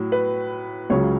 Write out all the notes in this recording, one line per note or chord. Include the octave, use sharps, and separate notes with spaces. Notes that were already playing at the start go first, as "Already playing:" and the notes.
Already playing: A2 F#3
B4
C#2 C#3 F#3 C#5